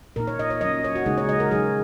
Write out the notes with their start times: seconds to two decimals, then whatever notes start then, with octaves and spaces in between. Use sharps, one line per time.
0.16 A#2 A#3 D#4 A#4
0.27 C#5
0.39 D#5
0.50 C#5
0.61 F#3 C#4 D#5
0.84 C#5
0.95 F#4
1.06 C#3 G#3 D#4 G#4
1.18 C#5
1.29 D#5
1.40 A#4
1.51 F#3 D#4 G#4